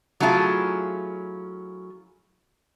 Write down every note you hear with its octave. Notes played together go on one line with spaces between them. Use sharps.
F#3 A3 C#4 E4 F4 G#4